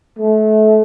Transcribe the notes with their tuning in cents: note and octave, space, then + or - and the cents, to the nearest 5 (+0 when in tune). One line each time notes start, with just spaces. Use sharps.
A3 -30